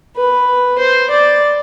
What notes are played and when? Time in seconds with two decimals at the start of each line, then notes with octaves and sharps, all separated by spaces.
0.16 B4
0.78 C5
1.10 D5